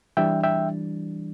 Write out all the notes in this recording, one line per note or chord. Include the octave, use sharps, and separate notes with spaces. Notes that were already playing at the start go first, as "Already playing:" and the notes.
E3 G3 D4 E5 G5
E5 G5